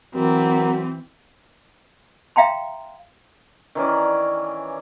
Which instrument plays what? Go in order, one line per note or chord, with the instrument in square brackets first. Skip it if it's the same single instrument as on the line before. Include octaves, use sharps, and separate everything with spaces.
[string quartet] E3 [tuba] F#3 [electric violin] C4 [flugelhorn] A#4
[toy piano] E5 F5 G5 A#5 C6
[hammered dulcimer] D#3 E3 C#4 D5